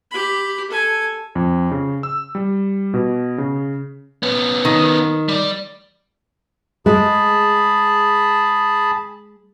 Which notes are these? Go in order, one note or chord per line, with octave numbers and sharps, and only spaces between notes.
G4 B5
A4 G#5
F2
C#3
E6
G3
B2
C#3
B3 C#4
D#3
G3 D5
G#3 G#4 A5 B5